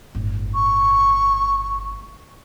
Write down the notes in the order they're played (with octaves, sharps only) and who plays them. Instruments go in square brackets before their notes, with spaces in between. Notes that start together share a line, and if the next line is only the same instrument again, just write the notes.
[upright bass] G1 A2
[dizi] C#6